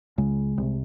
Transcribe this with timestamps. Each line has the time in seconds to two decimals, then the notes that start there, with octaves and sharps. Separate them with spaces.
0.18 C#2 C#3 G#3
0.58 C2 C3